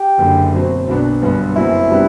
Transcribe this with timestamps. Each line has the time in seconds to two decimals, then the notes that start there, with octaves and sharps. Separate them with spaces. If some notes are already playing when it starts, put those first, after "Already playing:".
Already playing: G4
0.18 F#1 F#2 D3
0.54 B2 F#3 C4
0.87 B1 B2 F#3 B3 D4
1.22 G1 G2 F#3 B3
1.56 F#1 F#2 F#3 C4 E4
1.90 C3 G3 B3 D4